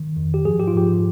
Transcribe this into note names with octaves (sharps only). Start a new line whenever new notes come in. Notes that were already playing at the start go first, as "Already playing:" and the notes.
Already playing: D#3
F2 D#3
G4
G#2 F3 G#4
G4
F4
G#2 F3 G4